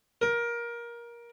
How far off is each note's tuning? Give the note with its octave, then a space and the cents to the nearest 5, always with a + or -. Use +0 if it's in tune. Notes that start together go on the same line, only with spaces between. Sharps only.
A#4 +20